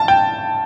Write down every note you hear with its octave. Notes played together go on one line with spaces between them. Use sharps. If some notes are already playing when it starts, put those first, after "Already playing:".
Already playing: A5
G5